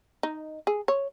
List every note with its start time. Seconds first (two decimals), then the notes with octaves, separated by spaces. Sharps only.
0.23 D#4
0.67 G#4
0.88 C#5